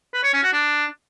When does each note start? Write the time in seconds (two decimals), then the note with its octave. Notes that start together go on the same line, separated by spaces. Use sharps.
0.14 B4
0.24 C#5
0.33 C#4
0.43 F#4
0.53 D4